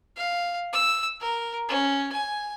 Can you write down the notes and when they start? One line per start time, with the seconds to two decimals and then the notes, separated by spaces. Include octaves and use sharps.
0.17 F5
0.73 E6
1.21 A#4
1.68 C#4
2.12 G#5